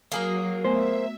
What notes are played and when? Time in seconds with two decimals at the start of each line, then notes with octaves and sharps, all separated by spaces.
0.12 F#3 A#3 G#4 A#4
0.65 A3 B3 C5 E5 G#5